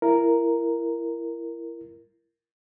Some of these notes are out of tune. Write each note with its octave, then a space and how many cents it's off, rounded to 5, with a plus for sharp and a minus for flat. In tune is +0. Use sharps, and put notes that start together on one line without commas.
E4 +30 A#4 +0